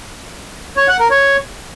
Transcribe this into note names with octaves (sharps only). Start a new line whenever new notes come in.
C#5
F#5
A#4
C#5